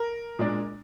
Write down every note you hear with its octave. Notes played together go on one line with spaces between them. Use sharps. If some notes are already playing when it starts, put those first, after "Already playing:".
Already playing: A#4
A#2 G#3 D4